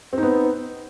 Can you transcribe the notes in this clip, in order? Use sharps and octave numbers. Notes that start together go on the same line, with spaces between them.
B3 C4 D#4